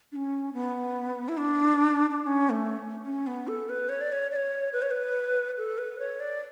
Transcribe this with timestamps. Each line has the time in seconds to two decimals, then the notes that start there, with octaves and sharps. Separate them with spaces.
0.12 D4
0.16 C#4
0.53 B3
1.29 E4
1.37 D4
2.10 D4
2.22 D4
2.27 C#4
2.50 A3
3.05 C#4
3.27 B3
3.48 A4
3.69 B4
3.89 C#5
4.01 D5
4.12 C#5
4.31 D5
4.36 C#5
4.73 B4
4.82 C#5
4.91 B4
5.58 A4
5.78 B4
5.99 C#5
6.20 D5